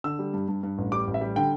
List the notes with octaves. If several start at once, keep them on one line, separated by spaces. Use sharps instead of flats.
D3 E6
G3
G2
G2
G2
A1
G3 D6
A1
E5
G3
D3 G5